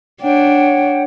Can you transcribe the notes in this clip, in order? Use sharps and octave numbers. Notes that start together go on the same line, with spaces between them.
D4 C#5 F#5 G5